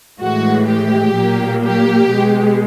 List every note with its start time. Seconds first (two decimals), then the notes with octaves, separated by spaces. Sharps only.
0.20 A2 E3 G#3 F#4
0.68 G4
1.15 A#2 F#3 A#3
1.63 G4
2.11 B2 G#3